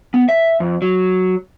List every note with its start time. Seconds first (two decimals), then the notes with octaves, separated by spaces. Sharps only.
0.14 B3
0.29 E5
0.60 F2
0.82 F#3